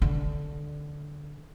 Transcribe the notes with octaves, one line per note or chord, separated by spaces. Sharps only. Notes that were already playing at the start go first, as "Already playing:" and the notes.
D3